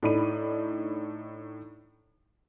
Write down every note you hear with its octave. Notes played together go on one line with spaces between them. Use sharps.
A2 D4 D#4 B5 D#7